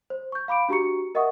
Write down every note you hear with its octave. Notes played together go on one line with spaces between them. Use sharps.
C5
C#6 G6
F5 B5 D6 D7
D4 F#4 G4 A#5 C#6 C#7
A#4 D#5 E5 F#5 C#6 D#6